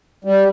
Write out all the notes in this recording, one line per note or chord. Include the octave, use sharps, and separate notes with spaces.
G3